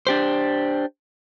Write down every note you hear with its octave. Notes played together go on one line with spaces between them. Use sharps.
D4 G4 C5